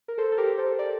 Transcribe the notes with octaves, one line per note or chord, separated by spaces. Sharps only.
A#4
A4 C5
A4
G4 A#4
A4 C5
A#4 D5